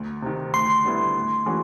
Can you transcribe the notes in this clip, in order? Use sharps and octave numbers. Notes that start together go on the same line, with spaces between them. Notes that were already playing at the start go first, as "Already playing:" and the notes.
Already playing: D2
C3 D#3
D2 C6
D3 G3 B3 E4
A2
E3 G#3 C#4 F#4